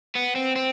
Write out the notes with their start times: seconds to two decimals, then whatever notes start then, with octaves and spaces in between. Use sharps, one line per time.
0.15 B3
0.36 C4
0.56 C4